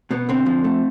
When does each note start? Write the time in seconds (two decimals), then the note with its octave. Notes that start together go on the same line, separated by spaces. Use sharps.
0.11 B2 B3
0.29 D3 C4
0.46 F3
0.64 A3